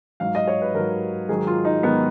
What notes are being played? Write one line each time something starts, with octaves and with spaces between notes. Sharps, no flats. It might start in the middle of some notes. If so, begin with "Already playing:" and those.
G#2 F#3 F5
D#5
C#5
B4
G#2 F#3 A#4
G#2 D#3 F#3 G#4
F4
D#4
G#2 D#3 F#3 B3